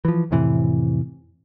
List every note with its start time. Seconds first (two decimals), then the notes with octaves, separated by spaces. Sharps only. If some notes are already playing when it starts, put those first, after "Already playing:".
0.05 E3 F3
0.31 F2 A2 C3 E3